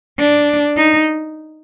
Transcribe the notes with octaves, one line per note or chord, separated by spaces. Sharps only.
D4
D#4